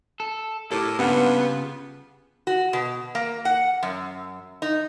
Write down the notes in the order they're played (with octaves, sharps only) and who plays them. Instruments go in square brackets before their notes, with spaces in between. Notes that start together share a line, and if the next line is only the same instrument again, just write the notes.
[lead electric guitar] A4
[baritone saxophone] A2 [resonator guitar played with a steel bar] G4 A#4 [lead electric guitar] A4
[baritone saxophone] G2 [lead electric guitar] C#3 F4 [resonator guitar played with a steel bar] A#3 G4 F#5 [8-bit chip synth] B3
[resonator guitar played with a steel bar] F#4
B2
A#3
F#5
F#2
D#4